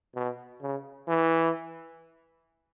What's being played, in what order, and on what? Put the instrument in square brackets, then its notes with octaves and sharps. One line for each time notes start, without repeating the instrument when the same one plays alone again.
[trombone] B2
C#3
E3